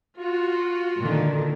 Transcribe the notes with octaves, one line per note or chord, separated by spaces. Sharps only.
F4 F#4
A#2 D3 D#3